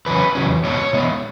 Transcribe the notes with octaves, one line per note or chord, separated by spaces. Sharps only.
E2 C#3 F#3 C#4 B4
E2 C#3 F#3 C#4
B2 G#3 B3 C#5
B2 G#3 B3